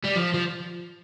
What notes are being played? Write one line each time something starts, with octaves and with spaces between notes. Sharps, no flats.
G3
F3
F3